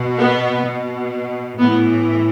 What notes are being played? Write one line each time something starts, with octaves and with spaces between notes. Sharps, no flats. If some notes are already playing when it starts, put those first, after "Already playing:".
Already playing: B2
B3
B2
A2 E3 B3